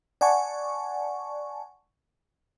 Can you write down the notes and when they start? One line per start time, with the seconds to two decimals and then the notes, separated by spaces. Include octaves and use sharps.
0.21 D5 F#5 G#5 A5 C#6